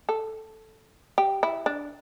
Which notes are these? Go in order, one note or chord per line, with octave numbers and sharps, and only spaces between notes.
A4
G4
E4
D4